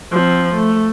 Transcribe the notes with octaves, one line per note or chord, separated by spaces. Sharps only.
F3 C4
A3